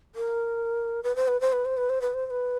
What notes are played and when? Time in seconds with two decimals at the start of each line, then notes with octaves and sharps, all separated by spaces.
0.15 A#4
1.03 B4
1.16 C5
1.28 B4
1.41 C5
1.53 B4
1.65 C5
1.77 B4
1.89 C5
2.02 B4
2.14 C5
2.26 C5
2.30 B4